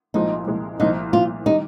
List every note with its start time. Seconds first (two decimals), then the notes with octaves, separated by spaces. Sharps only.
0.14 C2 A#2 F3 G#3 D#4
0.47 C2 A#2 F3 G#3
0.80 C2 A#2 F3 D#4
1.13 C2 A#2 F3 F4
1.46 D#3 G3 D#4